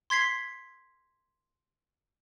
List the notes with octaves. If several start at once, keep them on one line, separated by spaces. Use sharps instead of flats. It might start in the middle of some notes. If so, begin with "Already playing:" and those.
C6 G#6 B6 C7